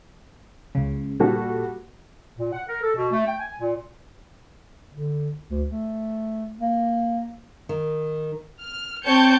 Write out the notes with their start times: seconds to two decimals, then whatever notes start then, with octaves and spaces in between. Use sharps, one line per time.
0.75 C#2 C#3
1.20 A#2 G3 F#4 A4
2.38 A#2
2.53 F#5
2.68 A#4
2.83 A4
2.96 B2
3.11 A3
3.26 G5
3.40 G#5
3.59 A#2
4.95 D3
5.50 D2
5.70 A3
6.60 A#3
7.69 D#3
8.60 F6
9.03 C4 C#5 G5 A5 G6 C#7